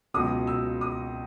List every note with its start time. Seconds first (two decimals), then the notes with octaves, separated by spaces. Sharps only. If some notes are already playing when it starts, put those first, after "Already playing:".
0.14 C#2 B2 F#3 D#6
0.47 E6
0.81 D#6